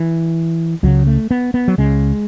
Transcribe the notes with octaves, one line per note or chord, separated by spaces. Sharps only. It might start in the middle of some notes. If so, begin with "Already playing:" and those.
Already playing: E3
C#2 C#3 F#3
A3
B3
B3
F#3
C#2 C#3 G#3